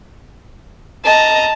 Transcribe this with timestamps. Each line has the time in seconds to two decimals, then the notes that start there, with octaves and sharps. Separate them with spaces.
1.05 D#5 A5 A#5